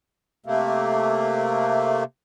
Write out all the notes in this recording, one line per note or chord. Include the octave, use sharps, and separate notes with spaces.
C3 A3 A#3